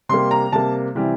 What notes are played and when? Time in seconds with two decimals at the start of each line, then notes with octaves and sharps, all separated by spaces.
0.09 C3 G3 A#3 C6
0.31 A#5
0.52 C3 G3 A#3 A5
0.95 C3 E3 G3 C4